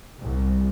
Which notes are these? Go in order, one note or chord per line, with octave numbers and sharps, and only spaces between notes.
C2